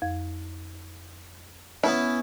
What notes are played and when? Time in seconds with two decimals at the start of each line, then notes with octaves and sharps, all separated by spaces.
0.02 F2
1.84 B3 C#4 E4